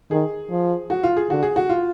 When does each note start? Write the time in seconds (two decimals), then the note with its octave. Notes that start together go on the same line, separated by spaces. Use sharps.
0.11 D#3 G#4
0.51 F3
0.90 F#4
1.03 F4
1.17 G#4
1.30 D3 F#4
1.43 G#4
1.56 F#4
1.69 F4